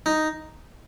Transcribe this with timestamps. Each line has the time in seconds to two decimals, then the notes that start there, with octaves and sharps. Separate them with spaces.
0.06 D#4